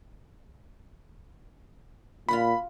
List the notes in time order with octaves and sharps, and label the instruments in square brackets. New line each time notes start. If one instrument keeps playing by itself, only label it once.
[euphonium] A#2 [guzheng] F4 F#4 F#5 [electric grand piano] B5